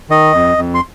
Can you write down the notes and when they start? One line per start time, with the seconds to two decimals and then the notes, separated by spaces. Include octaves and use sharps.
0.10 D#3 D#5
0.34 F2
0.57 F2
0.74 C6